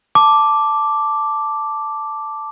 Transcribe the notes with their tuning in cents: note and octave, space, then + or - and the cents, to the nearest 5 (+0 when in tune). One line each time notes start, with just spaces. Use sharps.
A5 +0 D6 +0